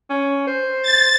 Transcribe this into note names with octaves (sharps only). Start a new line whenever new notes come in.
C#4
C5
A6